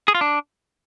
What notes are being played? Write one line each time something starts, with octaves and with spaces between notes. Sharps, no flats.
G#4
F4
D4